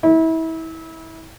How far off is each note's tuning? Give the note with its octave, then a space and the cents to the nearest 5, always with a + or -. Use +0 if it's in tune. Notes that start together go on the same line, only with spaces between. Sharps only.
E4 -30